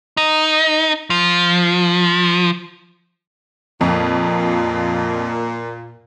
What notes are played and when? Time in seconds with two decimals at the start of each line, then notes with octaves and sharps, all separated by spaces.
0.17 D#4
1.10 F3
3.81 F2 A#2